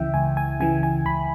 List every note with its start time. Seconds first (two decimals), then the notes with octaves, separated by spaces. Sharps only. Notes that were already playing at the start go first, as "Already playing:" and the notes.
Already playing: C#2 C#3 E3 E5 G5
0.14 C#2 G#5
0.37 G#5
0.60 C#3 E3 G#5
0.83 G#5
1.05 C#2 B5